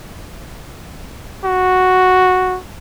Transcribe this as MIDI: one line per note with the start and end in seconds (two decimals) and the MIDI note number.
1.44 2.59 66